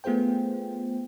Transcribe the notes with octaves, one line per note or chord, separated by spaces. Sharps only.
A3 B3 F4 G#4 C5 G5